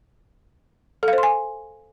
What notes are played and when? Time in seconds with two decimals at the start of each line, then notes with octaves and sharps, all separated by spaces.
1.03 A4
1.08 F5
1.13 C5
1.18 C6
1.23 G#5